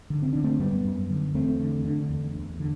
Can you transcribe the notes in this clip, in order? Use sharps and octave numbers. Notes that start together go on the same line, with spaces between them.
D3
C4
D3 D4
A3 C4
F#2 G3 B3
F#2
D3
E2 A3 C4
D3
D3
E2
E2
D3